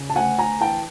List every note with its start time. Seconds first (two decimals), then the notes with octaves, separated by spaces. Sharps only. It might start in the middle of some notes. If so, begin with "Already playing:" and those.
Already playing: C#3
0.10 A5
0.15 D2 F#5 G#5
0.38 D2 G#5 A#5
0.61 E3 G5 A5